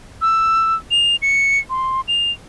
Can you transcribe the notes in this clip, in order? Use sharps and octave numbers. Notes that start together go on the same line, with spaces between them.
E6
F7
C#7
C6
F7